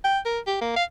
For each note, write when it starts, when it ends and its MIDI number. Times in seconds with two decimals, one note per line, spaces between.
0.04 0.19 79
0.25 0.39 70
0.47 0.56 67
0.61 0.76 58
0.76 0.84 77